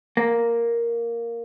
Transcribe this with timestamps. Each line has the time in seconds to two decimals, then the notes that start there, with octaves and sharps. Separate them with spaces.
0.17 A#3